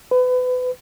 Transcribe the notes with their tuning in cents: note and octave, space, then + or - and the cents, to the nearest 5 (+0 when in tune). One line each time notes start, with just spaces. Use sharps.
B4 +30